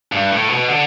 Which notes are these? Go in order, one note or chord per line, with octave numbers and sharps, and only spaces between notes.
G2
A2
B2
D3